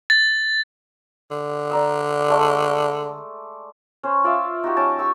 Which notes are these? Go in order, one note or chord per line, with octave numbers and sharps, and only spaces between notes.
A6
D3
D5 A#5 E6
G#3 A3 D5
C#4 C5
F4 D5 E5 F5
D#4 F#4 G4
F#3 C#4 G5 A5
G4 C#6 E6